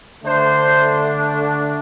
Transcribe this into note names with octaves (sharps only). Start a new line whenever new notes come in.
D3 A3 D4 C5